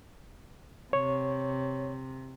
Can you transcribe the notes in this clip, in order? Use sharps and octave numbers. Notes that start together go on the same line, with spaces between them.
C3 C#5